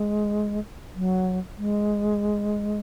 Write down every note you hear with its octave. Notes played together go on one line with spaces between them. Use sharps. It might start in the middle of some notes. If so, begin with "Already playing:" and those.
Already playing: G#3
F#3
G#3